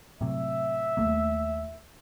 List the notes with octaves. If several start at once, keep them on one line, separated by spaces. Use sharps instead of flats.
A2 C3 F#3 E5
D#2 A3 A#3